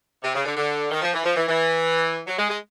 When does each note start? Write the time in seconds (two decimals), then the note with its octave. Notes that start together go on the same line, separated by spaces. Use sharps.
0.23 C3
0.35 C#3
0.46 D3
0.57 D3
0.91 D#3
1.02 F3
1.14 E3
1.24 F3
1.35 E3
1.48 E3
2.27 F#3
2.38 G#3
2.49 G#3